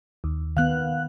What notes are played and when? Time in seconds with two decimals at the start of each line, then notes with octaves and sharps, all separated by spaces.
0.24 D#2
0.57 D#3 B3 F5 F#6